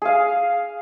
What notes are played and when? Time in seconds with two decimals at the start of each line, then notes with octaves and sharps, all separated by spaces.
0.02 G#4 F5